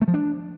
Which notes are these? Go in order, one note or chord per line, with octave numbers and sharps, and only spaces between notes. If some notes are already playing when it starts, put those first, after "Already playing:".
A3
F3
D4